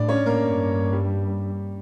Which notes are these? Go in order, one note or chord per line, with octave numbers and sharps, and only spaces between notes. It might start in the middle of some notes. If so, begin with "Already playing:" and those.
Already playing: A2 D4 D5
C#4 C#5
A#3 A#4
G2
G3 G4